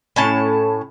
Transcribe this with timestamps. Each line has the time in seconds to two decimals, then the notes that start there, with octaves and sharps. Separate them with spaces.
0.16 A2 C#4 A5